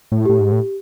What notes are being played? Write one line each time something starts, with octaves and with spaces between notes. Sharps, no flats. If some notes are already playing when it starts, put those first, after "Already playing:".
A2
A2 G4
G#2
A2